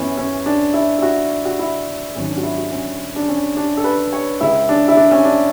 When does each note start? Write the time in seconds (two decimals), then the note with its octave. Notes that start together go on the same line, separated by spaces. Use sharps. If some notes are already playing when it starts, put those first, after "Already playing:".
Already playing: F#2 E3 B3 C#4
0.17 C#4
0.46 D4
0.74 E4
0.98 E4
1.02 F#4
1.45 F#4
1.59 E4
2.15 G#1 G#2 F#3 C#4
2.29 D4
2.37 F#4
2.43 E4
2.57 F#4
2.71 C#4
3.16 D4
3.28 C#4
3.57 D4
3.77 A4
3.84 B4
4.13 C#5
4.41 C#2 C#3 G#3 C#4 E4
4.69 D4
4.88 E4
4.97 D4
5.11 C#4
5.25 D4